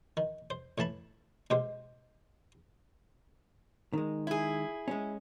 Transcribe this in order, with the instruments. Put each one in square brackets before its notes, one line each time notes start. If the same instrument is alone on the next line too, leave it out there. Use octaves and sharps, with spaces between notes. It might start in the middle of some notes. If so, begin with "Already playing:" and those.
[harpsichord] D#3
C5
A2 E3 A5 B5
B2 G#3 G4 C5
[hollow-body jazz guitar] D#3 G#3
[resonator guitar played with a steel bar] E4 G#4
[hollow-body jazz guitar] G#3 C#4